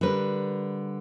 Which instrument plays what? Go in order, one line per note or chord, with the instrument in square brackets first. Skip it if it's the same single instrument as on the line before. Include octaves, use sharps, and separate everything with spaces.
[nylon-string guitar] D3 G3 A#4 B4